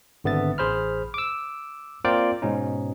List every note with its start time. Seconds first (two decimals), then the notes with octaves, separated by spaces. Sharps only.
0.24 G#1 D3 B3 E5 A6
0.58 A1 G#4 C5 B5 F6
1.14 D6 E6
2.04 A#3 C4 F4 A#4 D5 G5
2.42 G#2 B2 C#4 D#4